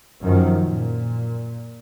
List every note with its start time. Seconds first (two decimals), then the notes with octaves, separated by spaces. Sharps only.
0.23 F#2 D#3 F3
0.62 A#2